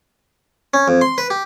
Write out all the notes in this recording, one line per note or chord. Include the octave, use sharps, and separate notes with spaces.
C#4
F2
C6
B4
G4